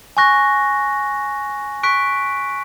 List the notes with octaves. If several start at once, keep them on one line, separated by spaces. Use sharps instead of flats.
G#5 C#6 F#6 A#6
C#6 F#6 B6 D7